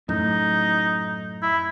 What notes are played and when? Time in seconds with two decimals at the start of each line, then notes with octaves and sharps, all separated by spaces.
0.09 F#2 A2 D#4
1.42 E4